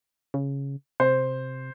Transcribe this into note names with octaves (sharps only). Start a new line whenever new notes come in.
C#3
C3 C5